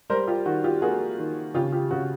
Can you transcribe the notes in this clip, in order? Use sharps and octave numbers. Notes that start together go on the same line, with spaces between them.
G3 A#4 C5
F4 G4
D#3 F#4
F4 G4
A#3 F#4 G#4
D#3
C#3 F4 G4
F4 G4
C#3 F#4